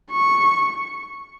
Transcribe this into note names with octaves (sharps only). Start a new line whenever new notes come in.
C#6